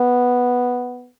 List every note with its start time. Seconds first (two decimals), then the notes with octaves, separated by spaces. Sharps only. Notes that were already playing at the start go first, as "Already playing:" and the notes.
Already playing: B3